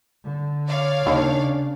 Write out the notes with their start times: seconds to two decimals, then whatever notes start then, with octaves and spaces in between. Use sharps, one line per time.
0.24 D3
0.68 C#5 D5 F5
1.06 D#2 C#3 D4